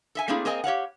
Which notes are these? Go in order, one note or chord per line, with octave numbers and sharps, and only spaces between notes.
A4 E5 G#5
A3 A#3 C4 D4 E4 G#4
A#3 C4 G#4 A#4 D#5 G#5
G4 C#5 F5 F#5